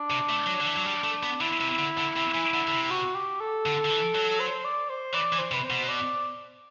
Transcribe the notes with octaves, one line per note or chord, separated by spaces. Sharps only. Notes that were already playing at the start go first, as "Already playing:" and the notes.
Already playing: D4
C3
A3
F#3
D3
E3
F#3
G3
A3
B3
D3 E4
C3
D3
D3
C3
E3
D3
D3
C3
F#4
G4
A4
D3
D3
E3
F#3
C5
D5
C5
E3 D5
E3
C5
C3 B4
C5
B2
D5